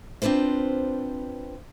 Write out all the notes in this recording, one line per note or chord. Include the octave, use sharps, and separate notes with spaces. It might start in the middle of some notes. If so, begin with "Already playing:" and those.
C4 D4 F4 B4 C5